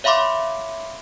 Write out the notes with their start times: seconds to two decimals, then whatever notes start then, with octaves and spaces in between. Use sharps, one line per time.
0.04 C#5 E5 F5 B5 C6 D6